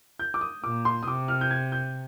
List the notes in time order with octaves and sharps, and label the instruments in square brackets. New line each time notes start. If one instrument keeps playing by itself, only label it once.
[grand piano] G6
D6
D#6
[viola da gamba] A#2 [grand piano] D6
[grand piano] C6
D#6
[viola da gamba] C3 [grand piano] D6
[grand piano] F6
G6
G#6
G6